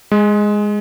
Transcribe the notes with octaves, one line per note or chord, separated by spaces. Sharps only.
G#3